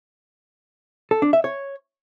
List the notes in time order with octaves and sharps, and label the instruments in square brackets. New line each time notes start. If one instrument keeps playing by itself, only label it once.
[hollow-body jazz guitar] A4
D4
E5
C#5